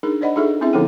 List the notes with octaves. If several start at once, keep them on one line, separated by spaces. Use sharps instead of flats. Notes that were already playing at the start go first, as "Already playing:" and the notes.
D4 D#4 G#4 A#4
D4 C5 D5 D#5 F#5 B5
D4 D#4 F4 G#4 A4 E5
C4 C#4 E4 G#4 E5
D3 F3 B3 D#4 A4 G5